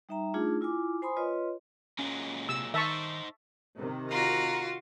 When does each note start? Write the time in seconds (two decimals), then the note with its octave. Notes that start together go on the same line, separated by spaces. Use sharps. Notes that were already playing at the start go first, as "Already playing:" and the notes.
0.09 G3 D#4 E5 G5 A#5
0.34 A3 D4 D#4 F4 G#4
0.61 E4 F4 G#5 D6
1.02 C5 G#5 B5 C6 D#6
1.16 F4 B4 C#5 D#5 C6
1.99 A#2 F#3 G#3 C#4
2.49 C3 E6
2.74 D#3 D#4 C5 E5 A5 C#6
3.76 C3 D#3
4.10 F4 F#4 A#5